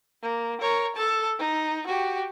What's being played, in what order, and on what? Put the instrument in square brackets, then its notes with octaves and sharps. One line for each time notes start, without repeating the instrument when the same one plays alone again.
[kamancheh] A#3
A#4 C#5
A4 A5
D#4
F#4 G4